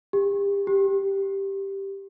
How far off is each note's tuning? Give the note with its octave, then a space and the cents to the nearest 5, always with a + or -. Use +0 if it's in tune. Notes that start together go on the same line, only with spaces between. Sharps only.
G4 +30
G4 +0